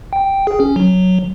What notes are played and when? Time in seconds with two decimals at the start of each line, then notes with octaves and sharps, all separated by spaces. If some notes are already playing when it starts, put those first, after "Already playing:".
0.13 G5
0.47 G#4
0.60 C#4
0.76 F#3